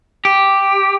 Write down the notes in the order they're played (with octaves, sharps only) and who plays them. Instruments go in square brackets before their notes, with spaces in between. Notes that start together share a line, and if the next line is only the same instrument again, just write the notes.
[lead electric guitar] G4